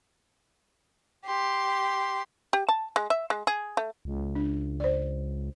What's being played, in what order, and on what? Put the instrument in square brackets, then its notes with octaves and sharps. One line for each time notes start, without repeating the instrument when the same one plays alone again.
[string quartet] G4 C6
[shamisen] G4
A5
G#3
E5
G#3
G#4
A3
[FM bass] C#2
[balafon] D4
C5 D5